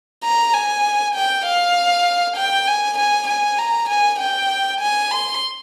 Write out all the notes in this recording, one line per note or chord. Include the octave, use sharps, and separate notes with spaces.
A#5
G#5
G5
F5
G5
G#5
G#5
G#5
A#5
G#5
G5
G#5
C6